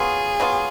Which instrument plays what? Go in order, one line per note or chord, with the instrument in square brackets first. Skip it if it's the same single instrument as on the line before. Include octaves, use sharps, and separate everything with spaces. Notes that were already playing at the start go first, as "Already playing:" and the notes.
Already playing: [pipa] F#3 B3 F4 [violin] G#4
[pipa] F#3 B3 F4